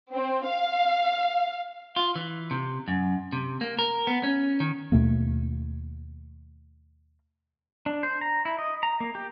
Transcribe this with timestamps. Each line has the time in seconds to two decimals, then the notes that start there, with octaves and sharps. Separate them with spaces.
0.13 C4
0.46 F5
1.96 F4
2.16 E3
2.51 C3
2.88 F#2
3.33 C3
3.61 A#3
3.79 A#4
4.07 B3
4.23 C#4
4.60 D#3
4.92 D#2 B2 A3 A#3
7.86 D4
8.03 C5
8.21 A#5
8.45 E4
8.59 D#5
8.83 A#5
9.00 A#3
9.15 G4